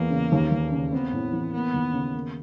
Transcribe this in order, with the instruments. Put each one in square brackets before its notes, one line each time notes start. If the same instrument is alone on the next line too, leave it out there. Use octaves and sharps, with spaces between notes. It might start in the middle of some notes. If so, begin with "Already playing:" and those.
Already playing: [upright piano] E2 B3 [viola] A#3
[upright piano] C#3
D#2
D#2
C#3
[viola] B3 [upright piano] C4
[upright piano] A2
E3
[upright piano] A#3 [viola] B3
[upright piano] D#2
C#3
A#3